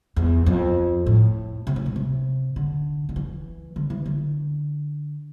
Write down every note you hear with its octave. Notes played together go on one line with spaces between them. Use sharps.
E2
F2
A2
C3
A2
B2
C3
D3
D3
E3
D3
E3
D3